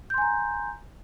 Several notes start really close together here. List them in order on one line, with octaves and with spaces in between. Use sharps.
G6 C6 G#5 A#5